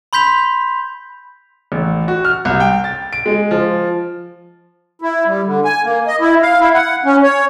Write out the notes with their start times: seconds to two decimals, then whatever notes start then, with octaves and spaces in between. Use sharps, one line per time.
0.13 B5 C6 G6 B6 F7
1.72 A1
2.08 F#4
2.25 F6
2.45 C2
2.60 G5
2.84 A6
3.13 D7
3.26 G#3
3.51 F3
5.02 E4
5.27 G3
5.45 D3
5.65 G#5
5.84 A#3
6.07 D#5
6.20 E4
6.42 F5
6.60 E4
6.74 F#5
7.05 C#4
7.23 C#5